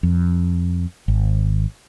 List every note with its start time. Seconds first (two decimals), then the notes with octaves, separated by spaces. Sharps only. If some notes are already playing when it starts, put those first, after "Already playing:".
0.03 F2
1.08 G#1